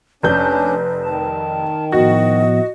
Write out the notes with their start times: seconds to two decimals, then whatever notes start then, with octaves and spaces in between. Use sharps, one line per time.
0.23 F1 C#4 D4 B4 G6
1.04 D#3 A5
1.92 A2 F3 B3 F#4 D#5